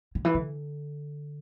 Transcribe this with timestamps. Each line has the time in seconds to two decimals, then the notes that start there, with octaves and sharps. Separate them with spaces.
0.15 D3
0.25 E3
0.35 D3